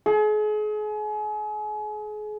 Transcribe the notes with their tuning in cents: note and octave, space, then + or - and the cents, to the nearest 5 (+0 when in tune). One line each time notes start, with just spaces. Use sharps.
G#4 +35